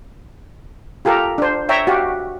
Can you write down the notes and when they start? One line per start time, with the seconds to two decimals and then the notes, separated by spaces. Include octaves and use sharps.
1.05 F4 G4 A4 A#4
1.38 D4 C5
1.69 C#5 E5 G5 A#5
1.87 F#4 G4 F5